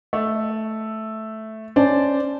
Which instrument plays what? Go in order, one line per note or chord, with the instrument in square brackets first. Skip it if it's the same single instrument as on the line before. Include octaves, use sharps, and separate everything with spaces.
[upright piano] A3
[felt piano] C#4 [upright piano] C5 D5 A5